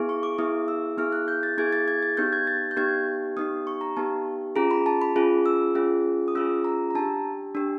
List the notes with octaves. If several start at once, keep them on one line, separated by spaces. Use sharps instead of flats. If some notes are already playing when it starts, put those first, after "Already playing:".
Already playing: B3 E4 G#4
C#6
D6
B3 E4 G#4 D#6
E6
B3 E4 G#4 F6
F#6
G6
A6
B3 E4 G#4 G#6
A6
G#6
A6
B3 D#4 G4 G6
G#6
A6
G6
B3 D#4 G4 G#6
B3 D#4 G4 D#6
C#6
A#5
B3 D#4 G4 A5
C#4 F4 G#4 A#5
B5
A5
B5
C#4 F4 G#4
E6
C#4 F4 G#4
D#6
C#4 F4 G#4 E6
A#5
A#5
D4 G4 A5
D4 G4